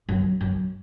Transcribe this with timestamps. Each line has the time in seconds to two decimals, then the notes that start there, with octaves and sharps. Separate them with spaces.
0.09 F#2
0.41 F#2